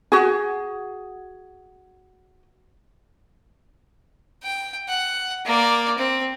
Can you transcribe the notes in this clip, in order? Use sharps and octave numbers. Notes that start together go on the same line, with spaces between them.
F#4 G#4
G5
F#5
A#3 D5
C4